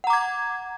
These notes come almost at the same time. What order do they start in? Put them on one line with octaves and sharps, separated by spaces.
F#5 A#5 D6 G#6